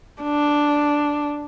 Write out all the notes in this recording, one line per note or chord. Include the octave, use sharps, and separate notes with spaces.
D4